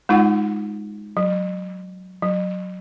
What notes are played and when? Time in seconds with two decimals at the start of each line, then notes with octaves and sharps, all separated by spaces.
0.09 G#3 D#4 F4 F#5
1.17 F#3
2.22 F#3